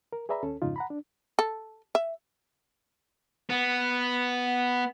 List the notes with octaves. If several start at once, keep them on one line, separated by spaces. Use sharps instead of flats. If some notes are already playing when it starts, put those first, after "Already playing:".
A#4
G#4 B4 D5 E5 A#5 B5
D#2 C#4 A4
F2 G#2 C#3 D#4 F4
F#5 A#5 B5
D4
A4
E5
B3